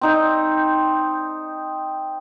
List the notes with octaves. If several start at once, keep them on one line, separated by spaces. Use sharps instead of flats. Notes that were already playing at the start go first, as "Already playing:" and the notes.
C4 D#4 G5